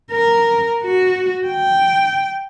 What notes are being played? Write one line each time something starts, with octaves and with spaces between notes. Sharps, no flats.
A#4
F#4
G5